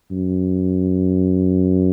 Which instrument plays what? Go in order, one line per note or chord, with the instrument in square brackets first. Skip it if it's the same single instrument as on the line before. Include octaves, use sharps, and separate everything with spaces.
[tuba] F#2